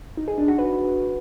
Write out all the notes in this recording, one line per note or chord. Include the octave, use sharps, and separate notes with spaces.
D#4
G#4
D4
F#4
B4